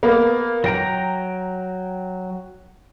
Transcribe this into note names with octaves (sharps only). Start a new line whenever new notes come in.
A#3 B3
F#3 G5 A#5 A#6